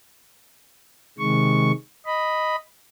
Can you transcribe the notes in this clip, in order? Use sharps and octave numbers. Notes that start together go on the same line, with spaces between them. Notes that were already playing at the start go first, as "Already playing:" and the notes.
C3 D#3 G#3 C#6
D#5 B5